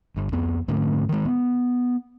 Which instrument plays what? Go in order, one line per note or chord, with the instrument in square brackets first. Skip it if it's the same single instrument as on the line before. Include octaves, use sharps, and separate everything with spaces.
[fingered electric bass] G1
F2 B3
G#2 D3 A3 C#4
D#3 G#3
B3